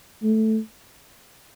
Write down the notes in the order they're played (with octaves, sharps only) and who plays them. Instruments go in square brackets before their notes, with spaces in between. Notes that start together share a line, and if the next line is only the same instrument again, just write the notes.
[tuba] A3